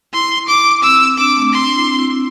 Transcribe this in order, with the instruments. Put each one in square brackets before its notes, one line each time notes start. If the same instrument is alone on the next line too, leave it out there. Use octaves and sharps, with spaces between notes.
[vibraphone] E4 [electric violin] C6
[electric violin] D6
[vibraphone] C4 [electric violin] E6
[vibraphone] D4 [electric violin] D6
[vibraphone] C4
A3
C4
[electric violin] C6
[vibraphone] D4
E4
C4
E4
E4